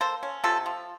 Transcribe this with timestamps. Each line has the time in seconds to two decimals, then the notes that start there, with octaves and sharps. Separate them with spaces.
0.01 A#3 A4 C5
0.23 C#4
0.44 C3 F4 A4
0.66 F3